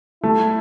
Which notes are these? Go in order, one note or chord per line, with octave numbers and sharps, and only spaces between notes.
A3 E4